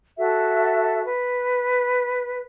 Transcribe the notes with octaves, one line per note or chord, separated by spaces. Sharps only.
F#4 A4 E5
B4